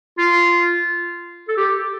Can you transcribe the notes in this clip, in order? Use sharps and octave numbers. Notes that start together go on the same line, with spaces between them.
F4
A4
G4